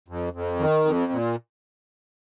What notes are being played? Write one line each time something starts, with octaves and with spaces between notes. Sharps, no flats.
F2
F2
D#3
F2
A#2